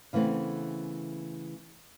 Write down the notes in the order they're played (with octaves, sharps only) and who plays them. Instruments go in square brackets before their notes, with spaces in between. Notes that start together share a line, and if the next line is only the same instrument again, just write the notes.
[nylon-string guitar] C#3 E3 A3 B3 C4